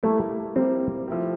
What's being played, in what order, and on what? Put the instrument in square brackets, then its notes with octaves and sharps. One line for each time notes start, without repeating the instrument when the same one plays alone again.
[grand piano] G3 A#3 E4 [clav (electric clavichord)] A3
[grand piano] G3 A#3 E4 [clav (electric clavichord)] C4
[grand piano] F3 A3 E4 G4